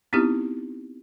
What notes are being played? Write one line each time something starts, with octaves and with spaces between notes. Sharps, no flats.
B3 C4 D#4 E4 G4